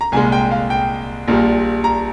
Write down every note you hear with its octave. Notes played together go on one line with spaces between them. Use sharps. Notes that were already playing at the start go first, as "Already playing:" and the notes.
A#5
C2 A#2 G#3 G#5
G5
F5
G5
A#1 A#2 G3
A#5